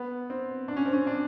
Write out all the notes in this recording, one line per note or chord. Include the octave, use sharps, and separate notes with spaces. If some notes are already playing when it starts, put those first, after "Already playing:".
Already playing: B3
C4
D4
C#4
C4
C#4
D4